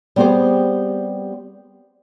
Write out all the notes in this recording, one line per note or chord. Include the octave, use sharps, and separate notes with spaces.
G3 B3 C4 G4 G#4 C5